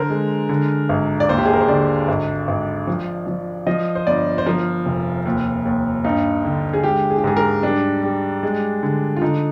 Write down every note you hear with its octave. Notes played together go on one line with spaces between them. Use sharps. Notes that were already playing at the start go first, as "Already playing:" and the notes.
Already playing: D3 A#4 C5
G#3
D3
G#1
D5
D#2 C5
G4
G#4
A#4
C5
D3 D5
G#1
G#1
F3
F3
F3 D#5
C5
G1 D5
C5
F3 A#4
F1
D#2
D#2
G2 D#4
D3
G#4
G#3 G4
G#4
G4
G#2 G#4
A#4
G3 D4
G3
G#3
D3
F4
D3 D#4